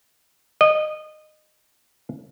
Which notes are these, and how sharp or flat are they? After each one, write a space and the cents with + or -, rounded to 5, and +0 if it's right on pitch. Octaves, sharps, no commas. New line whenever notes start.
D#5 -20